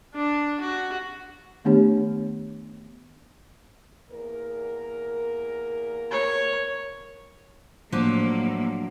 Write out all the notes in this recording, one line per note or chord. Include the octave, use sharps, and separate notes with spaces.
D4
F#4
D#3 A3 B3 D4 G4 C#5
E2 A#3 A#4
C#5
A2 F3 F#3 A#3 D4